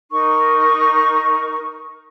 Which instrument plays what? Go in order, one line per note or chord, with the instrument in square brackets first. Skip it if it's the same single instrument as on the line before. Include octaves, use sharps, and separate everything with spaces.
[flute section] D#4 A#4 C#6